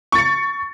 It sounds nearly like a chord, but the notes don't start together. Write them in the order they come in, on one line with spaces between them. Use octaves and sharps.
C#6 A6 C#7